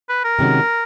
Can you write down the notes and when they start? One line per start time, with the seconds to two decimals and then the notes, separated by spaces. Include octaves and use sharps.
0.09 B4
0.24 A#4
0.39 C3 D#3 G#3 C#4 F#4